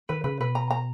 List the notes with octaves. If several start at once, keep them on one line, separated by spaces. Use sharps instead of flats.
D#3 B4
C#3 B4
B2 B4
A#5
A#5